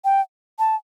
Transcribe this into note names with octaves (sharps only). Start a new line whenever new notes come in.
G5
A5